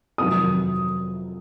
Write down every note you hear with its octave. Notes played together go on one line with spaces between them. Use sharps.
F2 C3 D#3 F#3 D#6